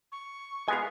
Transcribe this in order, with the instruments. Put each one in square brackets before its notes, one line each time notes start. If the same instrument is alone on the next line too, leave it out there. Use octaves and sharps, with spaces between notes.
[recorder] C#6
[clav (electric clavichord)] G#3 B3 F5 [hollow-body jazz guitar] G#4 G#5